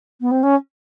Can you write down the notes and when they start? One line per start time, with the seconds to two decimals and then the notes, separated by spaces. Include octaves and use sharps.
0.21 B3
0.31 C4
0.43 C#4